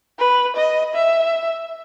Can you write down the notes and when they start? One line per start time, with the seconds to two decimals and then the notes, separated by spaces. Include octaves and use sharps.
0.19 B4
0.56 D#5
0.94 E5